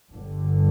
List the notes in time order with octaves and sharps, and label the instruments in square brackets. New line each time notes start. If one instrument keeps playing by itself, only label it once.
[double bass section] G1 G2 D3